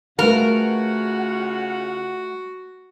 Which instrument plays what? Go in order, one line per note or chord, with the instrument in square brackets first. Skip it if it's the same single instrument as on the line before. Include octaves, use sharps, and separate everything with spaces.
[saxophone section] C#3 F4 F#5 [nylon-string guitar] A3 B4 F5 [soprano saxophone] F#4 [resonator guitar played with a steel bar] A#4